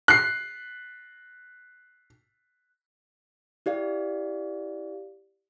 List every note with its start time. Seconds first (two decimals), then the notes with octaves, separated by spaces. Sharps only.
0.08 F#6 C7
3.66 E4 G4 D5 F5